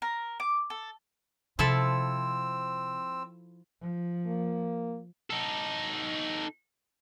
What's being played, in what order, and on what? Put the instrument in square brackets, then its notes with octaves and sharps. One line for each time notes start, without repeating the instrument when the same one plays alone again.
[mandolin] A#4
D6
A4
[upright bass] C3 [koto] F3 E4 A4 [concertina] C4 E6
[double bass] F3
[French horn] A#3
[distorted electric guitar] D#4 A4